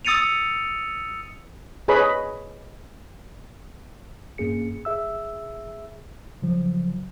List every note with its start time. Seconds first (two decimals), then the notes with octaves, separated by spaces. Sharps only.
0.05 D#6 E6 A6 C#7 D#7 F7
1.88 G#4 B4 C#5 D#5 B5
4.38 G2 A#3 C#4 G#4 C#7
4.85 G#4 E5 E6
6.42 C#3 F3 F#3